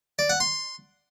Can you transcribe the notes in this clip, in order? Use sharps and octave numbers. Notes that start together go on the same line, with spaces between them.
D5
F#5
C6